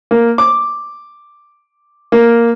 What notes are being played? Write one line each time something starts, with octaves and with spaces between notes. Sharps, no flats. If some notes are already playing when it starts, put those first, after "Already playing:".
A#3
D6
A#3